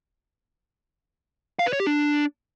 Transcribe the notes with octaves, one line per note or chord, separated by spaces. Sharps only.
F5
B4
C#5
G4
D4